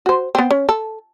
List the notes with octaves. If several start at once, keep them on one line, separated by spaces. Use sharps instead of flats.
F#4 C5
B3 C4
C#4
A4